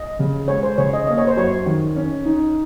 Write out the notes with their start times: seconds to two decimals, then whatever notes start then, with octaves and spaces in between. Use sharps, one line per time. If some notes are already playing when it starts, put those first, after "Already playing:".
Already playing: D#5
0.19 C#3
0.48 G#3 C#5
0.63 C5
0.78 C#3 C#5
0.93 D#5
1.07 A#3 D#5
1.18 C#5
1.27 C5
1.36 F#2 C#5
1.66 D#3
1.96 C#4
2.25 D#4